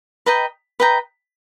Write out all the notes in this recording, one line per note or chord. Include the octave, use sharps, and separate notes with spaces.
B4 D#5 G5 A#5
B4 D#5 G5 A#5